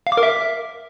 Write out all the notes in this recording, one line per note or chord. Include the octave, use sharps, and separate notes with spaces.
F5
D6
A#4
E5